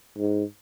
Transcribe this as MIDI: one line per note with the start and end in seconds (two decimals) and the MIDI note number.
0.18 0.44 44